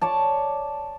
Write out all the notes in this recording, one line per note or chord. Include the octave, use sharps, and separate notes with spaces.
C#5 D5 A5